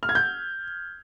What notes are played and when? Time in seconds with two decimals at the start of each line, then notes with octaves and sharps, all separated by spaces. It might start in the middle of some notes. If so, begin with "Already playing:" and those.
0.03 F6
0.09 G#6
0.15 G6